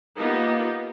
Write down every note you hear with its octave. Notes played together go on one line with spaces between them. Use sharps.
A#3 B3 D#4 F4 G4